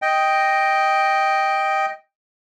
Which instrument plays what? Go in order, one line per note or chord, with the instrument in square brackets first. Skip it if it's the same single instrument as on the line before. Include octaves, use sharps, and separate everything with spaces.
[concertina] D#5 G5